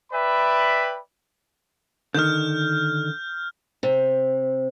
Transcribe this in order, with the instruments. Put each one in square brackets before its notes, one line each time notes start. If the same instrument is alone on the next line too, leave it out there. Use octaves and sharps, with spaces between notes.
[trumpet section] B4 D5 E5 G5 B5
[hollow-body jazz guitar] D3 D#3 [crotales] F6 G6
[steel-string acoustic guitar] C3